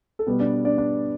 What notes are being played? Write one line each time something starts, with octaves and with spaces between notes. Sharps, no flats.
A4
B2 G3 B3 B4
D4 D5
D4 D5
D4 D5